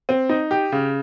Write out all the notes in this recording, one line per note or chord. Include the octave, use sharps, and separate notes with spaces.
C4
D#4
G4
C#3